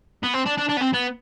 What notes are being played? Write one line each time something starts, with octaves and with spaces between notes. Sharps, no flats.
B3
C4
D4
D4
D4
B3
C4
B3